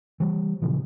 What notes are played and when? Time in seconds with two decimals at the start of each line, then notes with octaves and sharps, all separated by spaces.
0.20 E3 G3
0.62 A#2 C#3 E3 F3